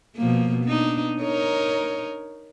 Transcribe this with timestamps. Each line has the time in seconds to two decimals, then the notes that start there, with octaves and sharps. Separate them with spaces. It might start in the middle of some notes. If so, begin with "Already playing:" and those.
0.16 B2 F3 A#3
0.64 B3 D4 D#4
1.22 D#4 A#4 C#5